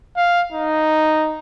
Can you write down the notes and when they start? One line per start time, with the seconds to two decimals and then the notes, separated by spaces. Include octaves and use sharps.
0.17 F5
0.52 D#4